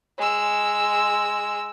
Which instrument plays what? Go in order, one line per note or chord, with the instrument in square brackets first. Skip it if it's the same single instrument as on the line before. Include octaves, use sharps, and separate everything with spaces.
[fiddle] G#3 E6